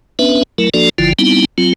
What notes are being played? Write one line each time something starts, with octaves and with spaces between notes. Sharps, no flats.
B3 C#4 D4 B4 E5
F#3 A3 E4 A#4
F3 A#3 D4 F#4 A4 D5
G1 D3 F3 E4 F4
G3 B3 C4 D#4 E4
F#3 C4 F4